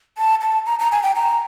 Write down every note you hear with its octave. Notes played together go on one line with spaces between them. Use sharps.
A5
A5
A#5
A#5
G#5
G5
A#5